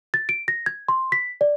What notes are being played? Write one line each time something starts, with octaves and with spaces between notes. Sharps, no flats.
A6
D7
A#6
G#6
C6
B6
D5